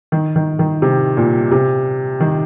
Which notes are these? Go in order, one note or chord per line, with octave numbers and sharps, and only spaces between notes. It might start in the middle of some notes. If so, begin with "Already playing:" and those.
D#3
D#3
D#3
C3
A#2
C3
D#3